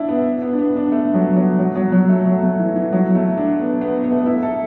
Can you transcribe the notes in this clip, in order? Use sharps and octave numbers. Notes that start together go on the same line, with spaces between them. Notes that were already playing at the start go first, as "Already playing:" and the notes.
Already playing: D4 E4
B3
B3
D4
B3
D4
A3
F#3
F#3
F#3
F#3
F#3
A3
F#3
A3
E3
E3
F#3
A3
D4
B3
B3
B3
A3
B3
E4
A4